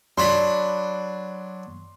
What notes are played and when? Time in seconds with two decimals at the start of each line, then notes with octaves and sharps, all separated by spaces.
0.18 F#3 D4 B5 C6